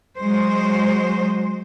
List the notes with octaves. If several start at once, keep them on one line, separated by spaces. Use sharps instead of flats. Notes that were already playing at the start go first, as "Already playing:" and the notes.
F#3 G#3 C5